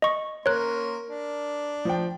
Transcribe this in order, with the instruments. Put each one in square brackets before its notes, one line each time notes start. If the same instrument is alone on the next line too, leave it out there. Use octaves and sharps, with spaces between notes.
[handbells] D#5 C#6
[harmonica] A#3 C#4 C6 [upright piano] A#4 [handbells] C#5 F#6
[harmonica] D4
[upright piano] F3 G5